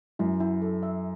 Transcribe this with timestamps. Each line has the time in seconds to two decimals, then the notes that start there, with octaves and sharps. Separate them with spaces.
0.19 F#2 E4
0.40 E4
0.62 A4
0.83 E5